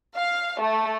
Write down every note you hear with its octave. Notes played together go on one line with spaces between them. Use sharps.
F5
A3